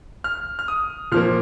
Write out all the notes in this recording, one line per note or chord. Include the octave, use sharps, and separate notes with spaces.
F6
F6
D#6
A#2 F3 A#3 F6